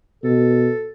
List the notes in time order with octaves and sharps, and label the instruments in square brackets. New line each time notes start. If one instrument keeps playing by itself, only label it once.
[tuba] B2 [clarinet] A4